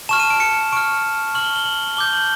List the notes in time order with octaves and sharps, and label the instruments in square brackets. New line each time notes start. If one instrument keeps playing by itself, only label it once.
[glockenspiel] A5 C#6 F6 E7
D#7
D7
C#7
C#6 F6 D7
C#6 F6 F#7
G7
G7
F#7
A5 D6 G6 G7
F#7